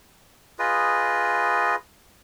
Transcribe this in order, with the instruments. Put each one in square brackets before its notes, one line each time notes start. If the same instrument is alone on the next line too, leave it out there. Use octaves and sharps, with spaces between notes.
[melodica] F4 G#4 B4 D#5